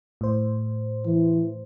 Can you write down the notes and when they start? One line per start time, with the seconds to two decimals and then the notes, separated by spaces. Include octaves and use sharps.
0.21 A2 C5
1.05 E3